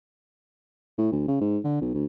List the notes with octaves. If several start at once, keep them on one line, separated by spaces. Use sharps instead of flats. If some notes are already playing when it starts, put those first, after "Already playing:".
A2
D2
C#3
G#2
D3
B1
D2